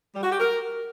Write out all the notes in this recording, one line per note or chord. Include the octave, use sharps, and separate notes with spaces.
G3
F#4
G4
A#4